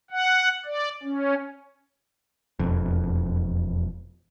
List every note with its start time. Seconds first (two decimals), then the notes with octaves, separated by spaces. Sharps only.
0.11 F#5
0.65 D5
1.03 C#4
2.59 E1 F2